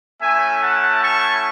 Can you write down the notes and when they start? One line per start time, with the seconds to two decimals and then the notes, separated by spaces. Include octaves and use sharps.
0.21 A3 C#4 E4 E5 G#5
0.62 F#5 A5
1.03 A5 C#6